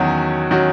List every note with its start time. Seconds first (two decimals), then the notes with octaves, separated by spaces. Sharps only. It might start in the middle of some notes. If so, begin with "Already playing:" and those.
Already playing: E2 D#3 F#3 C#4 F#4
0.51 D#3 F#3 C#4 F#4